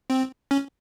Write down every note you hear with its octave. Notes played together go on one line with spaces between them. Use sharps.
C4
C#4